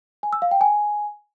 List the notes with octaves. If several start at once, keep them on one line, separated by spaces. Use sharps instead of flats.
G#5
E6
F5
G5
G#5